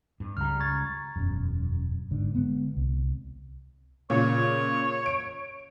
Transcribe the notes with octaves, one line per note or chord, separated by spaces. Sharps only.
G2
C#2 G3 A#5 F6
C#6 G#6 A6
E1 F#2
G1 G#2 D3
D3 G#3 B3
C2
A#2 C#3 C#5
D7